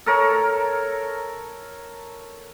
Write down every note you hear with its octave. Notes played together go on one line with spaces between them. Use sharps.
A4 A#4 C#5